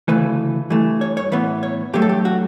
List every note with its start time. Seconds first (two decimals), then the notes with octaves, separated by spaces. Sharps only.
0.08 D2 C#3 E3 A3 B4
0.70 G2 E3 A3
1.01 C#5
1.17 C#5
1.32 A2 E3 B3 B4
1.63 C#5
1.94 G2 F#3 A3 G4
2.02 A4
2.09 G4
2.25 F#4